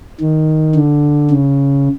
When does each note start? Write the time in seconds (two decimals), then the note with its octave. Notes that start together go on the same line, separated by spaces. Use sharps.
0.20 D#3
0.75 D3
1.31 C#3